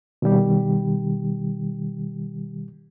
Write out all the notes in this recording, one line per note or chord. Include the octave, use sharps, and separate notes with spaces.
B2 D#3 G3 G4